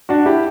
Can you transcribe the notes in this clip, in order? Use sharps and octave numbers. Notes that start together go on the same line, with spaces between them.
D4 F#4
E4 G4